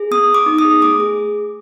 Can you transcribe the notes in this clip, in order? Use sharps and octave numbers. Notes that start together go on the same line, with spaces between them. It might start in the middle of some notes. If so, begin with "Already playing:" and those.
Already playing: G#4
B3 D#6
B3
D6
D#4
D#6
G#4
A3 D6
G#4